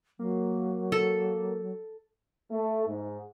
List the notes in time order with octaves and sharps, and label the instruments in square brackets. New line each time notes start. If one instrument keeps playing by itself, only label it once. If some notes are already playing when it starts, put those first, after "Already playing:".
[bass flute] F#3 [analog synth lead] A#3
[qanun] A4
[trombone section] A3
G#2